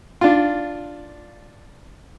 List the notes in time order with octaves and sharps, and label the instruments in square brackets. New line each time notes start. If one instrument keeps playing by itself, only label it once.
[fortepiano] D4 F4